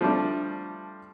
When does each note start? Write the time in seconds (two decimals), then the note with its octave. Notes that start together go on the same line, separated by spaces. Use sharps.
0.01 F3 G3 A3 D4